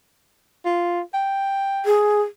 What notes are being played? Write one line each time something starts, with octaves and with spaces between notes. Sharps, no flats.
F4
G5
G#4